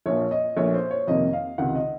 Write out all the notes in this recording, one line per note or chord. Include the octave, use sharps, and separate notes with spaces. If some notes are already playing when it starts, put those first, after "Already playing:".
A#1 A#2 F3 C#5
D#5
A#1 A#2 A3 C#5
C5
C#5
F2 C3 D#3 A#3 D#5
F5
C#2 C3 D#3 F#5
D#5